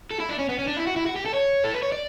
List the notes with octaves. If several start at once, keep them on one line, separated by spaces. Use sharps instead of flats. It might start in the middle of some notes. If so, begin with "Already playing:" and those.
A4
E4
D4
C#4
B3
C#4
D4
E4
F#4
E4
F#4
G4
A4
C#5
A4
B4
C#5
D5